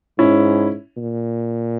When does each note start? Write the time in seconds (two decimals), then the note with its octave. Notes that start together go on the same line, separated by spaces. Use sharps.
0.18 G#2 C#4 E4
0.97 A#2